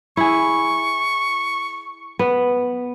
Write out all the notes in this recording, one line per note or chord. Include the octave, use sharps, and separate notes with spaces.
E4 G#4 C#6
B3